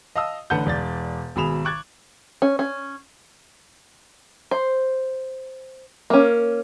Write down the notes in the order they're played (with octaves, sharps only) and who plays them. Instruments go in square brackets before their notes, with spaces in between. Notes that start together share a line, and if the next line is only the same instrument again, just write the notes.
[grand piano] D#5 F5 A5 D#6 E6
A1 D3 B4 F#5 A5 G6
E1 D5 A6
G#1 B2 G#4 B5 E7 F7
C#6 D6 F#6 G#6 A6
[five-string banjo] C#4
C#4
C5
A#3 C#4